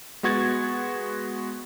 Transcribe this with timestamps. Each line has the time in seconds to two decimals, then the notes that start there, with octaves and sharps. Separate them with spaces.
0.23 G#3 B3 F#4 C#6 G#6 A6